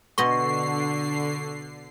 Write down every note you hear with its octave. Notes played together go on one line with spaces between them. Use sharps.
B2 D3 D#5 C6 C#6 C7